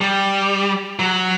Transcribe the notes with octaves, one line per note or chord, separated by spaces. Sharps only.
G3
F#3